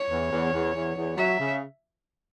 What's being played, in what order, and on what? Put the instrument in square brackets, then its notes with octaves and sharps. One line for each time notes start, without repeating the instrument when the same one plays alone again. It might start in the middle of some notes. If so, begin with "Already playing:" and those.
Already playing: [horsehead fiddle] C#5
[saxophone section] E2
E2
E2
E2
E2
[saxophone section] F#3 [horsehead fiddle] E5
[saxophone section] C#3